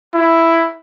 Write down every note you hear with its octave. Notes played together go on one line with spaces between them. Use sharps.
E4